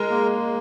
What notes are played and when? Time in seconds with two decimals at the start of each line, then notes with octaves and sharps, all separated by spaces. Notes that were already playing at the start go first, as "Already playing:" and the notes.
Already playing: G#3 A#4
0.10 A#3